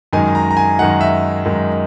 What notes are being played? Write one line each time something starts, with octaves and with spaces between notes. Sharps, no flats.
F#2 D#3 G#3 D#4 G#5
A#5
A#5
G#5
F#2 D#3 G#3 D#4 F#5
E5
F#2 D#3 G#3 D#4